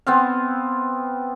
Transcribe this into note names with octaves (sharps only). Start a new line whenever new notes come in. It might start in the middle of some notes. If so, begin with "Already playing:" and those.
B3 C4 F5